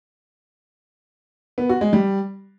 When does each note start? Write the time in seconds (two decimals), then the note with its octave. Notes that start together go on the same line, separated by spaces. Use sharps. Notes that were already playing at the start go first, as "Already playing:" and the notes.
1.58 B3
1.69 F#4
1.81 G#3
1.93 G3